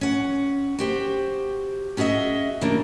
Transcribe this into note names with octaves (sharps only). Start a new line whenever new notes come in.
C#4 F#5
F#4 G4 C5
C#4 F#4 G#4 D#5 E5
C#3 E3 G3 A#3 D4